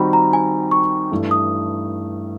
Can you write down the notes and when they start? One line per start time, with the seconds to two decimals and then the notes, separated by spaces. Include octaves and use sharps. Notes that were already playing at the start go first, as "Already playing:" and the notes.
Already playing: D#3 G3 C4 D#4 F#4 B5
0.13 A#5
0.33 G#5
0.71 C#6
1.11 G2 E3 A3
1.31 D#6